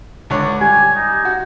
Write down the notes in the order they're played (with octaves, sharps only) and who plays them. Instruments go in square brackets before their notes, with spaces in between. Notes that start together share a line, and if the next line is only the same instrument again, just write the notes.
[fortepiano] C#2 D3 C#5
[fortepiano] G3 [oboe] G#5
[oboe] D#4
[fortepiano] F#4